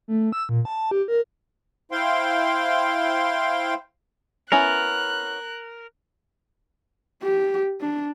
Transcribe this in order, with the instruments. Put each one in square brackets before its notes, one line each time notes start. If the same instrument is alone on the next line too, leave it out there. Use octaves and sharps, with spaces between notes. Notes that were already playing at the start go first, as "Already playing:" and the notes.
[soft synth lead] A3
E6
A#2
A5
G4
A#4
[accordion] E4 C5 F5 G5 C6
[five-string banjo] B3 C#4 E4 [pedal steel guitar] A#4 [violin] F#6
[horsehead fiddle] G4
D4